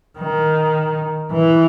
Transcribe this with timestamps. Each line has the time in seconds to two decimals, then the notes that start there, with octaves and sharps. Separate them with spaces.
0.19 D#3
1.31 E3